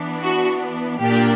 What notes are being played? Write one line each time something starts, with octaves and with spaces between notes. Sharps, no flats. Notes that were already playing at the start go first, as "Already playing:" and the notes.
Already playing: E3 B3 D4
F#4
A#2 A#3 D4 G4